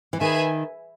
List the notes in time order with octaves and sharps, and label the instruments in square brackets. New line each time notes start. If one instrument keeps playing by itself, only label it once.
[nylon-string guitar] E3
[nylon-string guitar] D#3 [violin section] G#4 B4 E5 G#5